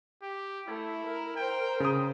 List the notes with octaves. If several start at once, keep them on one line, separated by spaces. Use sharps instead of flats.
G4
A3 E4
A#4
A#4 C5 G5
C#3 D#6